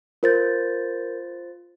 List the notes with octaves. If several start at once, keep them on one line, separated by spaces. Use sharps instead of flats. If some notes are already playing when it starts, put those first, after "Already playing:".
F4 A#4 C5 G6 A6